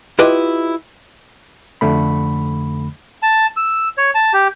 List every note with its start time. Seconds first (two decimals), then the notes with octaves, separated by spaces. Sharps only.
0.19 E4 F4 G4 B4 D#5
1.81 F2 D3 A3 B5
3.23 A5
3.57 E6
3.98 C#5
4.15 A5
4.33 G4